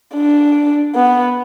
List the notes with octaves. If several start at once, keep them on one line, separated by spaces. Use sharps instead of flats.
D4
B3